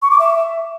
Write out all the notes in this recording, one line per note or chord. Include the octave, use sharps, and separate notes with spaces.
C#6
D6
E5